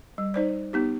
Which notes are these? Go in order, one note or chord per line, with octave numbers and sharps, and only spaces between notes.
G3
D#4 C5 D5
B3 D#4 G4